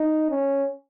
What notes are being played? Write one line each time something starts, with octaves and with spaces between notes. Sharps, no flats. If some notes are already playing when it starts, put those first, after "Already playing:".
Already playing: D#4
C#4